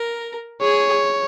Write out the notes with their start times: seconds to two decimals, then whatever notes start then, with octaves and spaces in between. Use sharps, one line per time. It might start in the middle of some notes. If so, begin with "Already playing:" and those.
Already playing: A#4
0.61 G#4 C#5